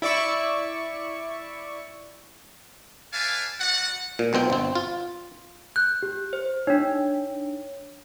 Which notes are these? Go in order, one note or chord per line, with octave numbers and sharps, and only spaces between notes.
E4 D5 E5 C#6
B4 D5 E5 F5 G#5 A5
G3 F#4 D5 F#5
A#2
B1 B2 C4 G5
G1 C4
F4
F#6 G6
G4
C5
D4 D#4 C#5